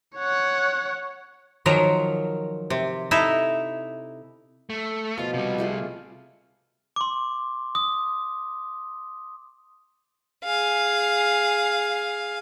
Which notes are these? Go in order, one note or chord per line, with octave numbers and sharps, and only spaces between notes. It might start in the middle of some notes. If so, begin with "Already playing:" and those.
C#5 F#5
D#3 F3 F#3 A#4
C3
D#4 E4 A4 E5
A3
B2 F3 F4
C3 G3
A3 F4 G#4
C6 D6
D#6
G#4 F5